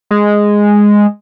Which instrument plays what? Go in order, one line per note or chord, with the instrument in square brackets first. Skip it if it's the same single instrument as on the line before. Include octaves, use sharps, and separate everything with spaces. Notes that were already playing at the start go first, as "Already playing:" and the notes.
[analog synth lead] G#3